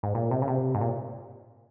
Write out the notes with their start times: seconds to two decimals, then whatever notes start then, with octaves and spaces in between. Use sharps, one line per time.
0.03 G#2
0.15 A#2
0.31 C3
0.42 C#3
0.48 C3
0.75 G#2
0.81 A#2